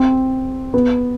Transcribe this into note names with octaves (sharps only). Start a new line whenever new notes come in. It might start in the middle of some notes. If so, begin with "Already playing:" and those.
Already playing: C4
B3